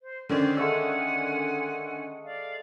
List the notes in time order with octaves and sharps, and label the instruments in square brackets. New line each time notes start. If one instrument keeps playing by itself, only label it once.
[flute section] C5
[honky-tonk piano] D3 D#3 C#4 [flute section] C5 D5
[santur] G#3 A3 E6 [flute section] F#5 G#5
[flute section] D5 F5